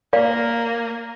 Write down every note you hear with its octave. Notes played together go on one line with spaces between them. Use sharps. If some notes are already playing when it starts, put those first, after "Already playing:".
A#3 D5 F5